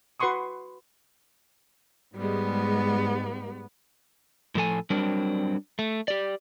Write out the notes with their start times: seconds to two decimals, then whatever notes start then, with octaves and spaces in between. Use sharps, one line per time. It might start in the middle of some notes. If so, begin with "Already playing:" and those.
0.20 F#4 B4 F#5 C6 C#6 D#6
2.17 G#2 G3 G#3 B3
4.55 A2 F3 A4 G#5
4.90 F#3 G3 C4 D4 A#4
5.79 A3
6.08 G4 D5